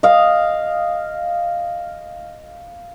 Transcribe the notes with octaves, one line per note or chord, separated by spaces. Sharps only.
D#5 F5